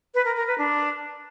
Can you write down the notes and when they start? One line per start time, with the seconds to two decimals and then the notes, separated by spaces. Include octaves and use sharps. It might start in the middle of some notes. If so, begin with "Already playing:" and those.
0.15 B4
0.25 A#4
0.36 A#4
0.47 B4
0.58 D4